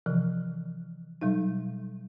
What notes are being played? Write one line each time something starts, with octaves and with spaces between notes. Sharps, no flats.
C3 E3 F3
B2 F#3 G3 D#4